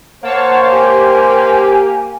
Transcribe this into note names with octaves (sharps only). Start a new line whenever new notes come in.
A#3 C5 C#5 F5 F#5 A5
G4 G#5